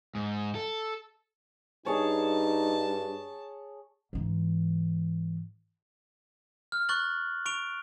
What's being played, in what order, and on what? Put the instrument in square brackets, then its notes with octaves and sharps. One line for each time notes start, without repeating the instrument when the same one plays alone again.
[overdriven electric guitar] G#2
A4
[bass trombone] G2 [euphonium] D#4 [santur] G#4 C#5 [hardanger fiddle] A5
[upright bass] G#2 E3
[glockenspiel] F6
C#6 F#6 A6 F#7
C#6 D7 F7